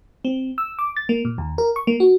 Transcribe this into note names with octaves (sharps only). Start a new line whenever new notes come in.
C4
E6
D6
A6
A#3
A#2
D#2
A#4
C#6
A#3
F#4